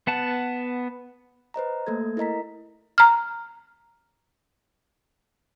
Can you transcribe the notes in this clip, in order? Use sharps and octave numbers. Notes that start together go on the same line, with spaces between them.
B3 F#5 A5
B4 C5 D#5 A#5
A3 A#3 A4 G#6
E4 A#4 D#5 A#5 B6
A#5 F6